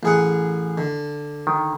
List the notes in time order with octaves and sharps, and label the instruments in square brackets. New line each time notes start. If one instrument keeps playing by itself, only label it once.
[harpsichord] A1 G#4 F#5
D3
[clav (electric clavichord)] D#3